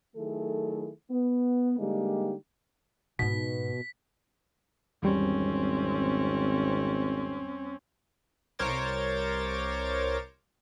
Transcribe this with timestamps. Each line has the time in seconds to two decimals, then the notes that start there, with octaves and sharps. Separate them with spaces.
0.16 D#3 F#3 A3 E4 G#4 A4
1.11 B3
1.79 D3 G3 G#3 A#3 D#4 G4
3.19 G#2 B2 D#4 B6
5.03 G#1 E2 G3 C4 C#4
8.59 C2 A#4 C5 C#5 D6 A6